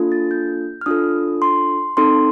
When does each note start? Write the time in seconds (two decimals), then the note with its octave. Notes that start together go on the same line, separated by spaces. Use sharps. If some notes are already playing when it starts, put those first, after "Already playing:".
Already playing: A#3 D4 F4 A4
0.12 A6
0.31 G6
0.81 F6
0.86 D4 F4 A4 D#6
1.42 C6
1.97 C4 D#4 A4 C6